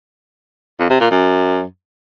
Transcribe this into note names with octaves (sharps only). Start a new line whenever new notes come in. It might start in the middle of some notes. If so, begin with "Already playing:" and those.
F2
C3
A#2
F#2